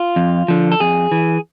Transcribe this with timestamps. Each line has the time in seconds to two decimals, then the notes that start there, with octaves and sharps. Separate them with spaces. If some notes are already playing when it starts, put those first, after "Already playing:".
Already playing: F4
0.16 F2
0.48 D3 F3
0.72 A4
0.80 F2 G#4
1.12 E3